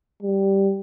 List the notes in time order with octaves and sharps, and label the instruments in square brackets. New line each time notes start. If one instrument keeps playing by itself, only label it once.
[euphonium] G3